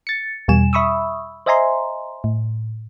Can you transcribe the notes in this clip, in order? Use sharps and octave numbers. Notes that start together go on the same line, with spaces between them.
A6 C#7
E2 B2 G3 G#5 E7
E5 B5 C#6 D#6 E6
C5 D#5 E5 G#5 A#5 C6
A2